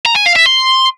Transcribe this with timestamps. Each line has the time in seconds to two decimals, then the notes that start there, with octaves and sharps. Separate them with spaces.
0.06 A#5
0.16 G#5
0.26 F5
0.36 E5
0.46 C6